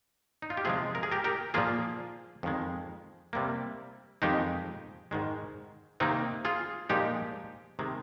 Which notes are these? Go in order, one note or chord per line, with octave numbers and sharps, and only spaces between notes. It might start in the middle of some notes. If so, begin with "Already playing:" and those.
D#4
F4
G4
C3 F3 G#3 F4 G#4
A#4
G#4
G4 A#4
G4 A#4
A#2 F3 A#3 F4 G#4
F2 D#3 G#3
C3 G3 A#3
F2 D#3 G#3 D#4 G4
G#2 D#3 G#3
C3 D#3 A#3 C4 D#4
F4 G#4
A#2 F3 G#3 D#4 G4
C3 D#3 G#3